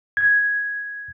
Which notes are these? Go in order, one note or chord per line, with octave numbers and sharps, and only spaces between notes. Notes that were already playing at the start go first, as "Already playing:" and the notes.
G#6